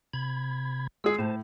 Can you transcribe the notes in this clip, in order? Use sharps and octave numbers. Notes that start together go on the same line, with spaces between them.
C3 B5 G#6
G#3 G#4 E6
A2 C5 A5